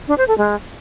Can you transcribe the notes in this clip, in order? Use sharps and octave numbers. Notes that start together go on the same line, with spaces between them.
D4
C5
A4
G#3